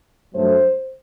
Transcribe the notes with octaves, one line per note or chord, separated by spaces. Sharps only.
G2 F#3 A3 C5